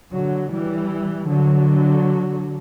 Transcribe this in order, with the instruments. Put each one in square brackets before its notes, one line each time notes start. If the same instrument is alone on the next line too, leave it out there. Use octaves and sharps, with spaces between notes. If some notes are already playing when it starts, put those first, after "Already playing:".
[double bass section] D3 F#3
E3 G3
D3 F#3